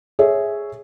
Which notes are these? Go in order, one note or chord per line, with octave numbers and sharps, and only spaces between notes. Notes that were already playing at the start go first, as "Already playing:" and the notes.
G#4 C#5 E5